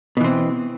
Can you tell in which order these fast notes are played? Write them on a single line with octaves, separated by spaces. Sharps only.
B2 E3 C4